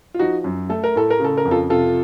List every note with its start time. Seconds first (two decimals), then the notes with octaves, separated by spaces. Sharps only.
0.14 F4
0.19 F3 D#4 F#4
0.44 F#2
0.69 A3 A4
0.84 A#4
0.95 A2 A4
1.10 A#4
1.20 C#3 A4
1.37 A#4
1.45 F2
1.51 F4 A4
1.70 C3 F4 A4